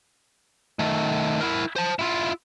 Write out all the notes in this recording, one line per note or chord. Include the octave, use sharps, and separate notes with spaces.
D#3 A3
E4 A#4
C5 A5
E4 F4